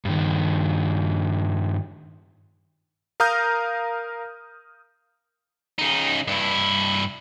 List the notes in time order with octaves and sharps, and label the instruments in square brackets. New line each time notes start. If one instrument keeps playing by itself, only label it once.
[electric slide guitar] G2 D#3
[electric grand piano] A#4 F5 A#5 D#6 F6 G6
[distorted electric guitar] C#3 D#4
G2 E4